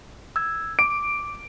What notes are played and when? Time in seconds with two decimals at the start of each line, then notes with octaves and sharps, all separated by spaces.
0.36 E6 G#6
0.79 D6 D7